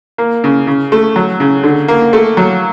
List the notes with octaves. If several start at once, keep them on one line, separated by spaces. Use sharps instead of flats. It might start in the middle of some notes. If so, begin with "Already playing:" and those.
A#3
C#3
C#3
A3
F#3
C#3
D3
A#3
A3
F#3